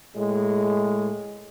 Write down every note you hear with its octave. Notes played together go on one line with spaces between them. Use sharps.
A2 G#3